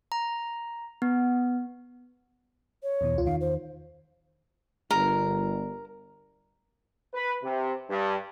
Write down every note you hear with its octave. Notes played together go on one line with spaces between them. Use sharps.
A#5
B3
C#5
E2 B2 E3
C#2 F4
E2 D#3 F5
C5
G1 A#4
B4
C3
G2